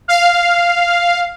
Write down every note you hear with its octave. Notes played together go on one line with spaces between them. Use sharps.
F5